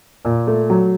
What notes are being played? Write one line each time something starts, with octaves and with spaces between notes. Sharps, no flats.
A#2
A3
F#3